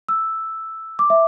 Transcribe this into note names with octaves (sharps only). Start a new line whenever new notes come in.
E6
D6
E5